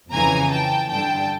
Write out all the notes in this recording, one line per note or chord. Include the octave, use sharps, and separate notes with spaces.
F2 C#3 E3 G#5 A#5
G5 A5
G2 D3 G5 A5